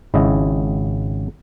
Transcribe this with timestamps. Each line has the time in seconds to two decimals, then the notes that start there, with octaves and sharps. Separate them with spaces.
0.14 G#1 C#3 E4 D#5